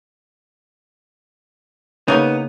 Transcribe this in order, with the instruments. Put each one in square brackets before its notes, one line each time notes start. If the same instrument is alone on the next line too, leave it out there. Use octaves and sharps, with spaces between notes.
[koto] C#3 A#3 G#5 [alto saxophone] B3 [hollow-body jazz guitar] D#4